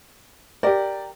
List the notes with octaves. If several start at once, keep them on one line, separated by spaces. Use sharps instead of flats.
G4 A#4 D5